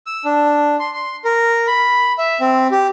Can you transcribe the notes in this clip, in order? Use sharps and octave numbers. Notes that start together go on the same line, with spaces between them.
E6
D4
C6
C6
A#4
B5
E5
C4
G4